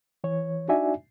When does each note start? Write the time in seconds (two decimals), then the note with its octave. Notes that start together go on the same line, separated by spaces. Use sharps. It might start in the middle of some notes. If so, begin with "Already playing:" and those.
0.24 E3 C#5
0.68 D4 D#4 F#4 D5 E5 G#5